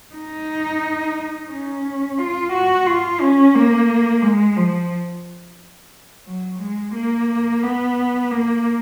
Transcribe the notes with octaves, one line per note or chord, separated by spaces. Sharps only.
D#4
C#4
F4
F#4
F4
C#4
A#3
G#3
F3
F#3
G#3
A#3
B3
A#3